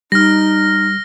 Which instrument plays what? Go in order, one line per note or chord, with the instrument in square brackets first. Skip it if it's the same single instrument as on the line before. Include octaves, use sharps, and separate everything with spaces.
[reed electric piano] G3 [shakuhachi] D#4 [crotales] F6 A#6